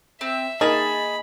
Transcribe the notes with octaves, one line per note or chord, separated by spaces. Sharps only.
C4 E5
A#3 D#4 G#4 G#5 A5 B5